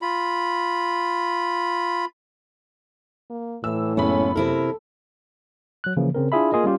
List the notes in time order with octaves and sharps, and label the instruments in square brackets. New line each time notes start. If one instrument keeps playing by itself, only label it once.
[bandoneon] F4 B5
[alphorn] A#3
[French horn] A2 [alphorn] E3 [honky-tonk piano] E6
[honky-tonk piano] F#1 B5 [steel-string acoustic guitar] B3 [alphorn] C#4
[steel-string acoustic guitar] C3 E4 A#4 [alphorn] A4
[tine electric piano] F#3 F#6
C#3 E3 F3 A#3
C#3 C4 A#4
D4 E4 F4 G#4 E5 B5
A#3 F4 G#4 A#4 D#5
G3 C#4 F4 G4